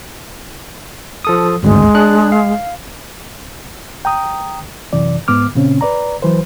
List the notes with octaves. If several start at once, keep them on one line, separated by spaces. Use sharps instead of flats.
F3 A4 D#6
G#1 D2 G2 G#3
D4 G#4 F#6
F5
G5 A#5 D#6
F#2 C3 E3 D5
G#2 B3 D6 F6
A#2 C#3 C4 C#4
B4 D5 A#5
E3 F#3 B4 C5